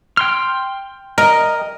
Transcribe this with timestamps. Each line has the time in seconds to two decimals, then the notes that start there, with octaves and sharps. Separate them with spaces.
0.17 G5 C6 F6
1.18 A#4 D#5